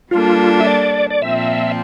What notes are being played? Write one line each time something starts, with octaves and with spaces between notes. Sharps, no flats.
G3 A#3 D4 F4 A4
E5
D5
D5
A#2 F3 C4 E5